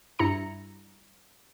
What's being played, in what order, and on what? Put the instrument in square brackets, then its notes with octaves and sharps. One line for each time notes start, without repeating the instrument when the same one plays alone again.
[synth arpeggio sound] G2 E4 A#5 C#7